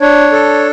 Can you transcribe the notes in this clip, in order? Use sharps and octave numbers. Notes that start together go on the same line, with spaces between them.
D4 C#5
A4